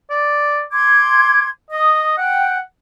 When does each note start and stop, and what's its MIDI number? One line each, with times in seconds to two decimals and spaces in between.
0.10 0.62 74
0.72 1.49 84
0.72 1.44 86
0.72 1.49 92
1.71 2.16 75
1.71 2.12 87
2.17 2.59 78
2.17 2.55 79